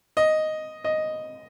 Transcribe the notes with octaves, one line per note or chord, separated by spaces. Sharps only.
D#5
D#5